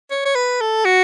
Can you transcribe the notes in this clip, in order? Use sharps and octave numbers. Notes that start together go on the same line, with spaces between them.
C#5
C#5
B4
A4
F#4